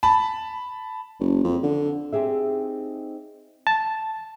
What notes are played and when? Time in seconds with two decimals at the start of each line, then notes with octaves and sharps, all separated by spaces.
0.03 A5 B5
1.20 F#1
1.44 F2
1.63 D3
2.12 C4 D#4 G4 G#4 E5
3.67 A5